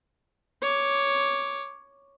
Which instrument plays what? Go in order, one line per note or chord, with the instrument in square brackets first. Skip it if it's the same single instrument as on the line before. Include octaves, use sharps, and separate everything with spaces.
[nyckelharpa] C#5 D6